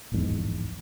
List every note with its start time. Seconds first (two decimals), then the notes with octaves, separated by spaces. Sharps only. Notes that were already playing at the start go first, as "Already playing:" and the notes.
0.12 D1 A#1 E2 G#2